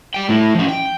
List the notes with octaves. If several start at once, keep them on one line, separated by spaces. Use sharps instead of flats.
G3 G5
A2 E4
F3 C#4
G5